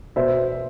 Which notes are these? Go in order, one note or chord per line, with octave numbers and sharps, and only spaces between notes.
B2 C5 E5